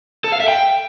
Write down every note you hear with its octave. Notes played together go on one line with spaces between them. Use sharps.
A4
F5
E5
G5